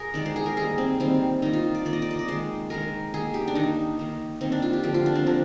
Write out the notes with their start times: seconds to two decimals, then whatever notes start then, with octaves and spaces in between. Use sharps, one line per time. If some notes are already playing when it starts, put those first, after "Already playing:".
Already playing: G#4 A#4
0.14 D#3 G#3 D5
0.26 C5
0.36 G#4
0.46 A#4
0.56 D#3 G3 A#3 G#4
0.78 C4
1.00 D#3 G3 A#3 C4
1.42 D#3 A#3 D#4
1.53 F4
1.75 D5
1.85 D#3 A#3 D5
1.93 D#5
2.02 D5
2.11 D#5
2.19 D5
2.28 D#3 G#3 C5
2.70 D#3 G#3 A#4
3.14 D#3 A#3 G#4
3.34 G4
3.47 D4
3.55 D#3 A#3 D#4
3.99 D#3 A#3
4.41 D#3 A#3 C4
4.52 D4
4.62 F4
4.73 G4
4.83 D3 F3 A#3 G4
4.94 F4
5.06 D4
5.15 C4
5.26 D3 F3 A#3 D4